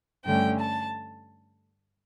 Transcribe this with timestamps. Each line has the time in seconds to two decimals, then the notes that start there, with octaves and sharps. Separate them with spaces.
0.25 G2 D3 A3 C#4 G5
0.59 A5